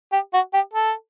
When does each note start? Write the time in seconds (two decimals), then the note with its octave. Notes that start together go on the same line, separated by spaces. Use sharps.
0.13 G4
0.34 F#4
0.54 G4
0.74 A4